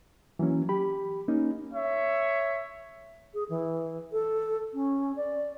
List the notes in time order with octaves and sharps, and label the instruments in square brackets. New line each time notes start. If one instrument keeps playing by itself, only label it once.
[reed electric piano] E3 F#3 A#3 C#4
G4 B5
A#3 C#4 D#4
[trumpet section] C#5 E5
[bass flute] G#4
E3
A4
C#4
D5